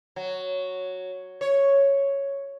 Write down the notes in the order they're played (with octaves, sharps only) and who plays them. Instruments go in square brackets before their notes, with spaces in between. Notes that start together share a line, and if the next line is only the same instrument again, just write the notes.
[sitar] F#3
C#5